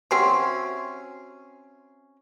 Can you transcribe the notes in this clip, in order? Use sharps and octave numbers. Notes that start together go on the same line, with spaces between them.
C4 C#4 F#4 E5 F#5 C6